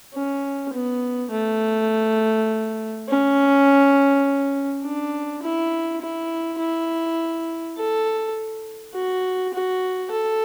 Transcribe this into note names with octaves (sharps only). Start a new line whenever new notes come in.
C#4
B3
A3
C#4
D4
E4
E4
E4
A4
F#4
F#4
A4